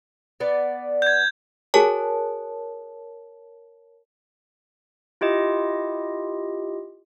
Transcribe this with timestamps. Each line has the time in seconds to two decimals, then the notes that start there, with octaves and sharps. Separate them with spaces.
0.40 B3 D5
1.02 G6 G#6
1.74 F#4 G#4 A#4 C#5 G#5 A5
5.21 E4 F4 G4 D#5